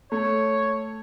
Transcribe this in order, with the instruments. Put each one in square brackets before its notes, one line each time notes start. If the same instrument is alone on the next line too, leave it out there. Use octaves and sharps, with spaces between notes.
[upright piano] A3 [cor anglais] C#5